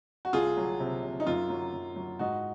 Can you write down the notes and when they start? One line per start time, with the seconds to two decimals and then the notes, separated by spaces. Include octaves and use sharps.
0.25 F#4
0.33 C2 F4 G#4
0.57 F#3
0.80 C3
1.03 C3
1.20 D#4
1.27 F#2 F4
1.50 F#3
1.73 F#2
1.96 F#3
2.19 G#2 D#4 F#4